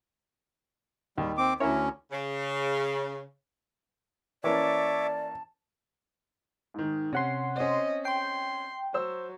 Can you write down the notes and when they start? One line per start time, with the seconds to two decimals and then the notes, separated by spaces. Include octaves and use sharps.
1.18 D#2 G3
1.38 C4 D6
1.60 D2 C#4 E4 A#4 C#5
2.12 C#3
4.44 E3 A#3 C#4 C#5 D5 E5 A5 D6
6.74 G#2 D#3
7.13 C3 C#4 F#5 C6
7.56 C4 C#4 D#5
8.05 G5 C6
8.94 F#3 C5 E6